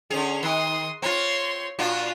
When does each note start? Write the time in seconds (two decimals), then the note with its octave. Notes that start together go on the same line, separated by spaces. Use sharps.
0.11 D3 C#4 G#4 F7
0.43 D#3 C6 D#6
1.02 C4 F4 C#5 C6
1.79 A#2 D4 F4 F#4